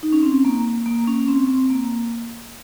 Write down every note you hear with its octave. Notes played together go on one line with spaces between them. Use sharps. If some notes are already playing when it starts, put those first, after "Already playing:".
D#4
C#4
C4
A#3
A#3
C#4
C4
C4
A#3